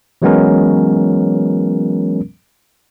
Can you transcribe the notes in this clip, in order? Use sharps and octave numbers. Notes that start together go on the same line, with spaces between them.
E3 F#3 G#3 B3 C#4 A#4